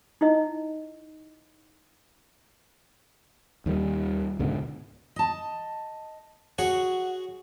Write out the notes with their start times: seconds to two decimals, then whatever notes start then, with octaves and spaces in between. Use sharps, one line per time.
0.21 D#4 E4 D#5
3.66 D#2 D#3 E3 G3
4.39 C#2 G#2 B2 D3
5.16 D#5 A5
6.58 F#4 G#4 C#5 F#5